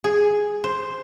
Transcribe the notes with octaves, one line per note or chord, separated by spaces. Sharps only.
G#4
C5